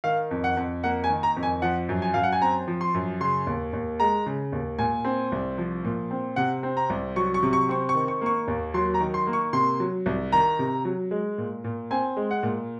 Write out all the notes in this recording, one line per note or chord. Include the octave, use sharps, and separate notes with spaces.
D#3 F5
F2
F#5
F2
A#3 F#5
G#5
D#3
A#5
F2
G#5
F3 F#5
F#2
G#5
F#2 F5
F#5
G#5
C4 A#5
F3
C6
F#2
C#3 C6
D#2
D#2
G#3 A#5
C#3
D#2
A#2 G#5
C4
C2
F3
A#2
C4
C3 F#5
C4
A#5
C2
F#3 C#6
C#6
C3
C#6
C4 C#6
C#6
D#3
C#6
A#3 C#6
D#2
F#3 C6
A#5
D#3
C6
A#3
C#6
C3 C6
F#3
C2
D#3 A#5
C3
F#3
G#3
A#2
A#2
C4 G#5
G#3
F#5
A#2